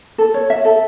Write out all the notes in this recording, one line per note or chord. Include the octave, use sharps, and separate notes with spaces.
A4
C#5
E5
A4